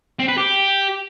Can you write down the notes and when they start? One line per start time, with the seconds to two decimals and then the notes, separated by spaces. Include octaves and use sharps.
0.19 C4
0.28 B4
0.38 G4